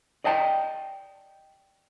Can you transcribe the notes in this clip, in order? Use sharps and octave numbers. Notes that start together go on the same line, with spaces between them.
D5 D#5 G5 A5